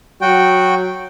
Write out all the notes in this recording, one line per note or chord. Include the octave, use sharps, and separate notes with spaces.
F#3 F#4 G5